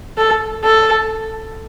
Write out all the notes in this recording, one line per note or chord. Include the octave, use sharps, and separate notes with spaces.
A4
A4